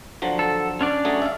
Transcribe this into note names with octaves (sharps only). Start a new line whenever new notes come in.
D3 F3 F#3
A4
C#4 D4 D5
F#3 A3 G#4
E5 F5